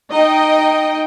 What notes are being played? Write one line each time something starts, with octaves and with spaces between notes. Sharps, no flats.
D#4 D#5 G5